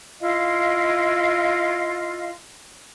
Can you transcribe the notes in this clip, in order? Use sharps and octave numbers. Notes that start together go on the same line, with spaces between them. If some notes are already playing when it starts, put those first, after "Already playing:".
E4 F4 D#5 F5